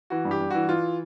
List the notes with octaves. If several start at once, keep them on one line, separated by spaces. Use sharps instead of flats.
E3 F#4
G2
G4
G2
E3 F#4
E3 F4